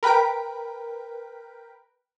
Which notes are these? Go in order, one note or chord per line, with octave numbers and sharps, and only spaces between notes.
A#4 B4 G5 B6 D7